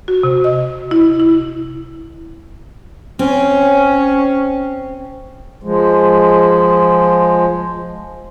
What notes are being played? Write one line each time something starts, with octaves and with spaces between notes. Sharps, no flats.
F#4
C3
D#5
E4
E4
C4 C#4
F3 G#3